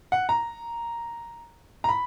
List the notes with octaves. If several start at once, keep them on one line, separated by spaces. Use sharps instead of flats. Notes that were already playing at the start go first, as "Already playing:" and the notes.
F#5
A#5
A#5
B5